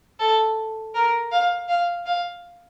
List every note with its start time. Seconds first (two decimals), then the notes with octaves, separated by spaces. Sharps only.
0.20 A4
0.94 A#4
1.32 F5
1.68 F5
2.06 F5